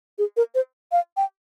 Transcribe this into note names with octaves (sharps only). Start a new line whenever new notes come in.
G#4
A#4
C5
F5
G5